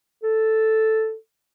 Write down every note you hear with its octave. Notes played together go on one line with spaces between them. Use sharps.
A4